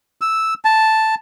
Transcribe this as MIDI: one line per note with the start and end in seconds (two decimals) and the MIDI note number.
0.21 0.54 88
0.65 1.15 81